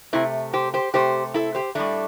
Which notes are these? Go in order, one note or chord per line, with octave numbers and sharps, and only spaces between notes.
C3 A3 C4 E4
G4 C5
G4 C5
C3 A3 G4 C5
E4 A4
G4 C5
A2 G3 A3 D4